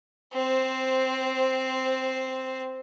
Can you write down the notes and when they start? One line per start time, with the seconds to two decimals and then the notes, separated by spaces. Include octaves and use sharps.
0.33 C4 C5